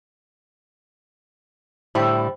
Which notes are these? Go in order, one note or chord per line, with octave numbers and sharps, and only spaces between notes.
A2 D3 G3 E4 C5 G5